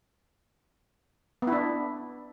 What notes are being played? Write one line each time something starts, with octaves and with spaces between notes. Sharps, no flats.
B3
E4
D4